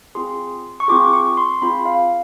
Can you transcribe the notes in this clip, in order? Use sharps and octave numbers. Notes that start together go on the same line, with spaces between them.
C4 F4 G#4 C6
C#6
C4 F4 G#4 D6
C#6
C6
C4 F4 G#4 B5
F5